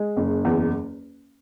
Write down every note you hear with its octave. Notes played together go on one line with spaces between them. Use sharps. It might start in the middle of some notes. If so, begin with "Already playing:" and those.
Already playing: G#3
F#1
E2